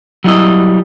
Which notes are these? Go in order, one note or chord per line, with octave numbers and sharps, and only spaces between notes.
F#3 G3 E4 D#5